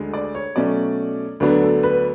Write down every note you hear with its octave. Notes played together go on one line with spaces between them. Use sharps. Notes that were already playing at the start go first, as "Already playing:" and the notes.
Already playing: D2 D3 G#3
D5
C#5
B2 F#3 A3 C#4 D5
D2 D3 F#3 B3 D4 B4
A4
B4